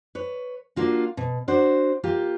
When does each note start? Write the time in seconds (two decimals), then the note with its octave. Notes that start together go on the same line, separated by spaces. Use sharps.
0.15 B4 C#5
0.76 A#3 D4 F4 F#4
1.17 B2
1.48 D4 F#4 C5
2.03 A#3 F4 G4